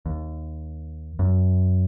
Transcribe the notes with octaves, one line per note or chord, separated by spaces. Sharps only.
D#2
F#2